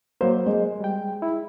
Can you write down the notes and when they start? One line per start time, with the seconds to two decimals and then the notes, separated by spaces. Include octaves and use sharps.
0.21 F#3 A#3 C5
0.46 G#3
0.80 G3 G5
1.22 E4